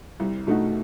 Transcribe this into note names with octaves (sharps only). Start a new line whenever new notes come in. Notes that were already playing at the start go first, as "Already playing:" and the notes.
C2
B2 A3 D#4 F#4